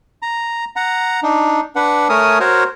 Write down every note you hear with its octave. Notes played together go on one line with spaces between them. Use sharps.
A#5
F#5 A#5
D4 D#4
D4 B4 F#5
A3 A#4 C#5 G#5 D#6
F#4 A#4 C5 C#5